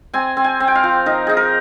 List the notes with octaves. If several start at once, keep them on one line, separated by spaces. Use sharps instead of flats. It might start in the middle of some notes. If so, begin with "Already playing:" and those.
C4 G#5
C4
G#5
C4
G5
F5
F3
D#4 A#4
D#4 G#4
A#4